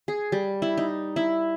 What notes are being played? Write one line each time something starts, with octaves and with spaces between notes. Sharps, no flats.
G#4
G3
E4
D#4
E4